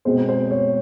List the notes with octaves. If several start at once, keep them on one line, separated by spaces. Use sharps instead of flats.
B2 G#3 C4 C5
C5
C#5